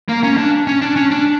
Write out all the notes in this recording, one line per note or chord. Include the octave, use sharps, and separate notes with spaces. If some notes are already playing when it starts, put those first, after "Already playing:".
A#3
C#4
D4
C#4
D4
C#4
D4